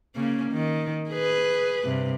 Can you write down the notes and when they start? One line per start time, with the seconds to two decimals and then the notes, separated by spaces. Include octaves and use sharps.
0.15 C#3 A#3 C#4
0.52 D#3
1.10 G#4 B4
1.84 G2 C3